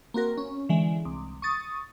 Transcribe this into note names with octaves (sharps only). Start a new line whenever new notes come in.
A#3 C4 F#4 A#4
C#4
D3 E3 G#3
C2
C#6 D#6 A6